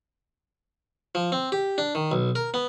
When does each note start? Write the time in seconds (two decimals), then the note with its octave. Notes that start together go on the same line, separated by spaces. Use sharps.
1.15 F3
1.32 C4
1.52 G4
1.78 D4
1.95 D#3
2.12 B1
2.35 A#4
2.54 B3